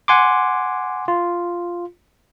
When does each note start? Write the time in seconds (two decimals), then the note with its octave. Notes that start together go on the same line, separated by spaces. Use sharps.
0.08 F#5 G#5 C6 D6
1.08 F4